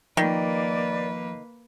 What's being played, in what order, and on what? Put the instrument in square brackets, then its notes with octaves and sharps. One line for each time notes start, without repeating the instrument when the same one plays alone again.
[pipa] D#3 [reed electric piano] F3 [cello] A#3 B4 [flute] D5